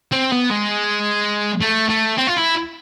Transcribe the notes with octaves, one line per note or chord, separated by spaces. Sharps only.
C4
B3
G#3
A3
A3
C4
F4
E4